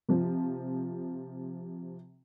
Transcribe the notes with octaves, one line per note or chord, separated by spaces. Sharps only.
C3 F3